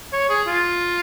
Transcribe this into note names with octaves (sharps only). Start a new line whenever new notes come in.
C#5
G#4
F4